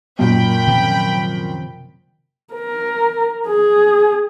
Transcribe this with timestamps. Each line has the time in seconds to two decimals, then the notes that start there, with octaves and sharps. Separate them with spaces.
0.19 F#2 A#2 G5 B5
0.67 C3 D#3 F3
2.54 A#4
3.47 G#4